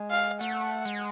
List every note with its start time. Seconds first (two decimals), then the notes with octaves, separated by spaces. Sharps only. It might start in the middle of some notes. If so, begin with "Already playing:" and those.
Already playing: G#3
0.10 F5
0.41 A3 F#5
0.85 G#3